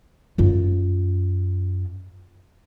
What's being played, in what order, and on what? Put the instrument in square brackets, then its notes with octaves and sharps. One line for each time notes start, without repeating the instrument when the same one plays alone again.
[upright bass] F#2 F4